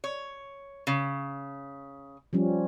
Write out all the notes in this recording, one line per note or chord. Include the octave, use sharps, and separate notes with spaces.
C#5
C#3
F3 G3 C#4